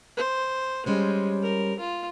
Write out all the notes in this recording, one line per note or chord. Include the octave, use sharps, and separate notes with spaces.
C5
G3 G#3 C#4 C5
A#4
F4